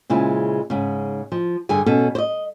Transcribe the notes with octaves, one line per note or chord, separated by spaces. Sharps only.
A#2 C#3 G#3 E4 C5
G#2 C#3
F3
G2 D3 G#4 G#5
B2 C#4 A4
C5 D#5